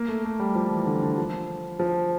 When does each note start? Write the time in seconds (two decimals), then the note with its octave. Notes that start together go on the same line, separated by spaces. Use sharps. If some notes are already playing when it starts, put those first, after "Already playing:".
Already playing: A#3
0.08 A3
0.25 A3
0.40 G3
0.55 F3
0.71 E3
0.86 D3
1.02 D3
1.18 F3
1.80 F3